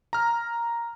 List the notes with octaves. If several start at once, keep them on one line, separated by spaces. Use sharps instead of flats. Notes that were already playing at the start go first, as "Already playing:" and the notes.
A#5 F6